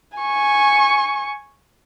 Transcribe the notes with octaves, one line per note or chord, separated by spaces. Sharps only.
G#5 C#6